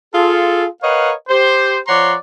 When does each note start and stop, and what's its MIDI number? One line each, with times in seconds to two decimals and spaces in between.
0.13 0.65 65
0.13 0.65 68
0.13 0.65 69
0.83 1.12 70
0.83 1.12 71
0.83 1.12 73
0.83 1.12 75
0.83 1.12 77
0.83 1.12 78
1.29 1.78 67
1.29 1.78 72
1.87 2.14 53
1.87 2.14 73
1.87 2.14 74
1.87 2.14 78
1.87 2.14 82
1.87 2.14 84